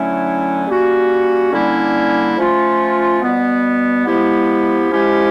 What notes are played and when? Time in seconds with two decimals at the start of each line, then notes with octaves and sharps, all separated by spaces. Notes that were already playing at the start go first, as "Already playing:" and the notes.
Already playing: D3 F#3 A3 C#4 E4
0.67 G3 A#3 C#4 F#4
1.52 D3 G3 A#3 C#4 E4
2.37 F3 A3 C#4 F4
3.22 B2 G3 B3
4.05 F3 G#3 B3 E4 G4
4.90 F3 G#3 C#4 E4 G4